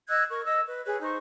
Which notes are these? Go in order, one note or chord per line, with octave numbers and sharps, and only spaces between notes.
D#5 E6 F#6 G#6
A#4 C#6
D#5 E6
B4
G#4 B4 C#5
D#4 C5 C#6